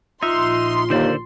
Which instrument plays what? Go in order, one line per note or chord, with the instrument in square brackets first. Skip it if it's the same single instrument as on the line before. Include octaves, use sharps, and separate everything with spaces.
[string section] A#1 C6 [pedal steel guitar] D#4 E5 [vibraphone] F4
[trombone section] D#2 [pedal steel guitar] D3 C5 D5